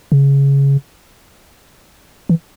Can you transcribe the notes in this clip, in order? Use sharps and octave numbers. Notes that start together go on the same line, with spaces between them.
C#3
E3